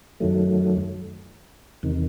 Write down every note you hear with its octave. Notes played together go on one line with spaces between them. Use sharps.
F#2 D#3 F#3 A3
E2 C3 D#3